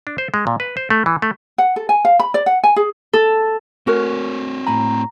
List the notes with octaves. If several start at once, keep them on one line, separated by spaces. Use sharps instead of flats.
D4
C5
G#3
A#2
B4
C5
A3
E3
A3
F#5
A4
G#5
F5
B5
D5
F#5
G#5
G#4
A4
A3 C4 F#4 A#4 C#5
A2 G#5 A#5 B5